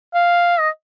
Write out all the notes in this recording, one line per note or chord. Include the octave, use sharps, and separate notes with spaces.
F5
D#5